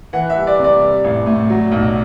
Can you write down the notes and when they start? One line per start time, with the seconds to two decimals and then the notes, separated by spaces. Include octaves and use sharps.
0.13 E3 F#5
0.30 E5
0.36 G3
0.47 D5
0.59 C3
0.64 D5
0.81 G3
1.04 A1
1.26 A2
1.50 F#3
1.72 B1